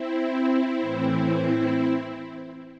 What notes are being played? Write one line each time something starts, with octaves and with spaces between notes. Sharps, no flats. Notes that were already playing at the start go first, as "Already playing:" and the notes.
Already playing: C4 E4
A2 E3